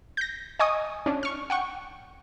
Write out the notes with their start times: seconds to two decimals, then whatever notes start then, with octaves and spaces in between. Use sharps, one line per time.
0.17 G6 A#6
0.59 D#5 G#5 C#6 D#6
1.06 C#4 D4
1.23 C#6 F6
1.50 F#5 G5 C#6